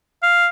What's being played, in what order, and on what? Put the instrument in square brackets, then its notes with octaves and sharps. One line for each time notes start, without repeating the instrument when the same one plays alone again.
[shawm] F5